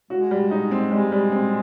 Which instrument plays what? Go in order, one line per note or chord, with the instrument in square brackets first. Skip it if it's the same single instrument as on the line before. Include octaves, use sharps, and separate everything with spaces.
[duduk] G#3 [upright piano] F#4
[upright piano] G3
D#4
C4
[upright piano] G3 [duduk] G#3
[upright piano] G3
C4